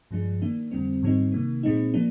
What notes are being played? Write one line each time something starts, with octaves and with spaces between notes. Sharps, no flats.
G2 F3 G#3 D4
D#3 A#3 D4
F2 D3 G3 C4
G#2 D#3 G3 C4 D#4
C3 D#3 A#3
A#2 G#3 C4 D#4
F3 A#3 D4